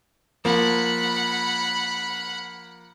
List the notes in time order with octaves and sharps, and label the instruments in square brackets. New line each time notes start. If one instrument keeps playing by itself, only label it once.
[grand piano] F3 A#3 [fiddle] F#5 B5